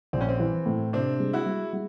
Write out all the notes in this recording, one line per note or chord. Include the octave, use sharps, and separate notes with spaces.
A#1 C4
C#4
C4
E3
A2
C3 C4 D4
G#3
E4 F#4
G#3
G#3